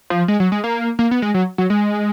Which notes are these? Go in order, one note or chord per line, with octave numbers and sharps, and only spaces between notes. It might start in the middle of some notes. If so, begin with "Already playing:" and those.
F3
G#3
F#3
G#3
A#3
A#3
B3
G#3
F#3
F#3
G#3